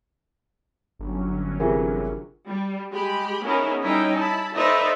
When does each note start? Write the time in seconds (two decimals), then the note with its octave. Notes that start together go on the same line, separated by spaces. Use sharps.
0.99 G1 D3 F#3 C#4
1.60 C3 E3 F4 G#4 A#4
2.47 G3
2.91 G#3 G4 B5
3.43 B3 C#4 D#4 E4 G#4 A#4
3.83 G3 C#4 D#4 E4 G5
4.16 E4 A5 B5
4.55 D#4 A4 B4 C5 D5 E5